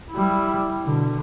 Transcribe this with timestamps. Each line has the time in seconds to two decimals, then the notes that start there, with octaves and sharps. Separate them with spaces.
0.11 G3 E4
0.84 B2 D3